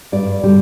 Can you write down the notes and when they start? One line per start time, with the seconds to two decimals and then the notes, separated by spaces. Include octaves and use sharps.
0.12 G2 D5
0.43 D3 G3